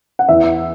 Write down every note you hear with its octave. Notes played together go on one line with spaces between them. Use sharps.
F#5
E2 E5